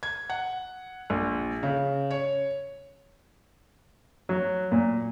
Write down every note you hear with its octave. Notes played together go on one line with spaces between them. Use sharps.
G#6
F#5
A#1
C#3
C#5
F#3
A#2